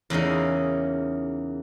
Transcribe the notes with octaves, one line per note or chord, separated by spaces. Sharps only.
E2 C#3 A#3 D#4